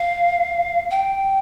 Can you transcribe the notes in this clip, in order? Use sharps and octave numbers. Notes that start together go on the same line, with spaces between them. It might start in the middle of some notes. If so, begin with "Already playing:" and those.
Already playing: F5
G5